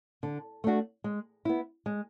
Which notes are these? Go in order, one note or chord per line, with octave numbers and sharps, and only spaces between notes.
D3
A3 D4 F#4
G#3
B3 E4
G#3